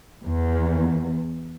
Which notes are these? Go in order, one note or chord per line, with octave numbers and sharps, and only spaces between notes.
E2